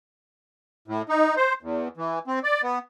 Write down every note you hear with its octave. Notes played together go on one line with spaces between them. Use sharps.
A2
D#4
C5
E2
E3
C4
D5
B3